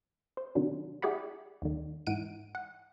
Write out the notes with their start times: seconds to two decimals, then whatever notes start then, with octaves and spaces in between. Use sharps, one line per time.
0.37 C5
0.55 C3 D#3 F#3 D4
1.02 E4 G4 G#4 D5 F#5 B5
1.62 D#2 D#3
2.07 G#2 E3 F#5 D7 D#7
2.55 F#5